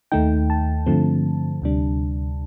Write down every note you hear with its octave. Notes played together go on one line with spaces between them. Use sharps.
D#2 D#3 A3 D#4 G5
A5
G2 D3 F3 A3 C4
D2 C3 G3 D4